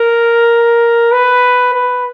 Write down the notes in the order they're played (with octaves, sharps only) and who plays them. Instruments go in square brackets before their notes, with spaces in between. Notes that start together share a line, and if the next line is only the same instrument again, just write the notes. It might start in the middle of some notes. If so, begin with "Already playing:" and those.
Already playing: [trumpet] A#4
B4
B4